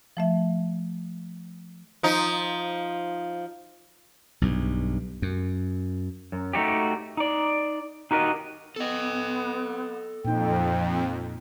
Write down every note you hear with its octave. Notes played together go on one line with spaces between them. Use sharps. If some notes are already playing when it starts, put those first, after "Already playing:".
F3 A3 E5
F3 D#4
B1 G2
F#2
F#2
A3 D#4 F#4 G4
D#4 D5
D#4 F#4 G4 A#4 D#5
B3 A4 D#5
F2 A#2 D#4 G5